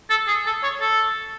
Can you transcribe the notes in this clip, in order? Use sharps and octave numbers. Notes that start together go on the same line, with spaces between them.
A4
G#4
A4
C#5
A4